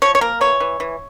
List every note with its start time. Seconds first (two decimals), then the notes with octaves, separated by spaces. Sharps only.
0.02 F3 C#5
0.15 C#5
0.21 A#3 A#4
0.41 E3 C#5
0.60 E3
0.80 E3